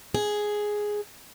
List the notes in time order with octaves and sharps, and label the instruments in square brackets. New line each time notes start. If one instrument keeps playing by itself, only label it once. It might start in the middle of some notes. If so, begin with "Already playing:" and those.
[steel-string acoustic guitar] G#4